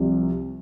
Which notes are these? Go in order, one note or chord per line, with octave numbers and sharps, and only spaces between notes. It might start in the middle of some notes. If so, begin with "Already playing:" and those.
Already playing: C2 C3 F3